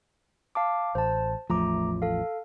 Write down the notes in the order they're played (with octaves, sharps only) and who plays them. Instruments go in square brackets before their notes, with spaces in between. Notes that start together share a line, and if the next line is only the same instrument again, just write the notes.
[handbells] F5 A5 D6
[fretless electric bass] A1 [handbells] C5 A5
[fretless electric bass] A1 E2 F3 [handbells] A3 A#5 D6
[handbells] A4 F5